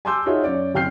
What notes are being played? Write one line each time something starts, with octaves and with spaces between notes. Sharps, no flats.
G#5 A5 C6 D6 E6 G6
D#4 F4 F#4 G#4 C#5 E5
F#2 C#5 D5
F#1 C4 G5 F6 G6 C7